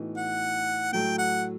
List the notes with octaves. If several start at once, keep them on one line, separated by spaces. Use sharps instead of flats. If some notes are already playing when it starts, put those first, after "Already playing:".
Already playing: A2 E3 B3 D#4 F#4
F#5
A2 F#3 A3 G5
F#5